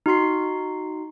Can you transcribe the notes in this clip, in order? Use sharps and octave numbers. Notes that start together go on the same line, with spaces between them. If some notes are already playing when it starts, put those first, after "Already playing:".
D#4 F#4 C6 C7